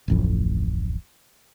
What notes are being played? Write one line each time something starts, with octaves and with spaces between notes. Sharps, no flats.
D1 A1 F2